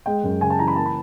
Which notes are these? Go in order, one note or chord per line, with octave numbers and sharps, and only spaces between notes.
G#3 G5
F#2
C#3 G#5
A5
E3 A#5
B5
A#3 A5
B5